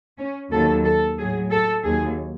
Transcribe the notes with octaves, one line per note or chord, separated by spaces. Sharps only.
C#4
D#2 D#3 F#3 A4
A4
A2 F#3 G#4
A4
D#2 D#3 F#3 G#4